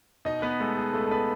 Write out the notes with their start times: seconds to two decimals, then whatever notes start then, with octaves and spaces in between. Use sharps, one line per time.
0.25 B2 D#4 D#5
0.42 B3 B4
0.60 G#3 A3 A4
0.77 G#4
0.93 C#2 A3 A4
1.06 A4
1.11 B3 B4